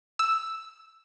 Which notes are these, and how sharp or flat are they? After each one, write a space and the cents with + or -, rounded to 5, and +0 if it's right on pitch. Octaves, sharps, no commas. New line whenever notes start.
E6 +0